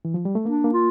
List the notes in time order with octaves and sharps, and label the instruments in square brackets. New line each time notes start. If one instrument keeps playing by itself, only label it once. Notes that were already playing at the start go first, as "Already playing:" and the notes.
[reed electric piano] E3
F3
G3
A3
[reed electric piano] A#3 [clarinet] D4
[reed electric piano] A#3
[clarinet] F4